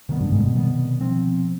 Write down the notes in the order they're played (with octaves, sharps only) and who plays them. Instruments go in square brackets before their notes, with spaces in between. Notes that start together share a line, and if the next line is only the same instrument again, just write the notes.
[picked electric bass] C3 D#3 G3 B3
[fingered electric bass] G2
G#2
B2
[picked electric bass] C3 D#3 G3 B3
F3 C4